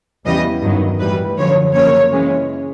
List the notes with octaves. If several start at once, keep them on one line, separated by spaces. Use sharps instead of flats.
E2 C#3 E3 G3 B3 D#5
G2 D#3 F#3 B3
A2 E3 G3 B4
F#2 D3 F3 C#5
F#2 C#3 F3 A#3 C#5
C#3 E3 G#3 C#4